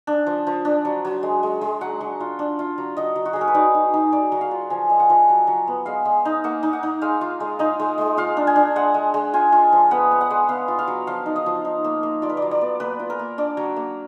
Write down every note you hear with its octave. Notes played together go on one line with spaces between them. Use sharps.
D4
F3
F3
D4
F#3
F#3
G#3
G#3
G#3
F#3 F#5
F#3
F4
D4
F4
F#3
F#3 D#5
F#3
F#4
F#3 G#4
A#4
B4
D#4 D5
D#4
D#4
F#3 D5
F#3
F5
F4
F3 G#5
G#3
F#5
F3
F#3
F#3
B3
G#3 F5
G#3
D#4
A#3 F#5
D#4
F#5
D#4
G#3 F5
F4
G#3
D#4 D#5
G#3
G#3
F4 F5
D4
G#5
D4
G#3 F#5
G#3
G#3
F4 G#5
F4
F3
B3 F#5
B3
F#5
G#3
B3 F5
F4
F5
F#3
F3 F5
D#4
D#5
F3
D#4
A#3
A#3
F4 D5
B4
D5
F#3
D5
B3
A#3 B4
F4
A#4
A#3
D4 D5
F#3
A#3